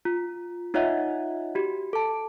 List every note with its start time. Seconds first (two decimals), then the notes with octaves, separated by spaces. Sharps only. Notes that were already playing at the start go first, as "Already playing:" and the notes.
0.05 F4
0.74 D#4 F4 C#5 D#5 E5 F#5
1.55 F#4 G4
1.93 A4 A5